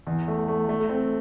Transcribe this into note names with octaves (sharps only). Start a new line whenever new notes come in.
E2
A3
A3
A3
C4